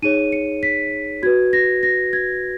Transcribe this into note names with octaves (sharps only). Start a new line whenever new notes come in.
D#4 G#4 C#5 D#7
C#7
B6
F#4 B4 G#6
A#6
A#6
G#6